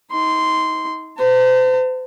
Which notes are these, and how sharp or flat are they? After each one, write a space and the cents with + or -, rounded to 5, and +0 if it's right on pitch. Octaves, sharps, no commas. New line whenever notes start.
D#4 +35 C6 -10
C5 -35 A5 +40